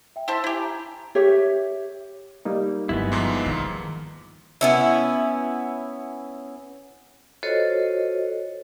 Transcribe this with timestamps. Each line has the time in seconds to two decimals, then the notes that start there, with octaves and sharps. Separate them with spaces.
0.16 E5 G5
0.28 E4 C5 A5 E6 B6
0.44 E4 G4 G#5 G6 D7
0.61 A5 A#5
1.15 G4 C#5 E5
2.45 G3 A#3 D#4
2.89 G1 F#3 G#3 B3 E4
3.12 E2 G#2 F3
3.46 D#3
4.61 B3 C#4 E4
7.43 F4 F#4 A4 C5 C#5 D#5